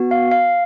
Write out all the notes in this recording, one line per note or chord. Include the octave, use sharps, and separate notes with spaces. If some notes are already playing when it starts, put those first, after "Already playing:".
Already playing: B3 F#4
F5
F5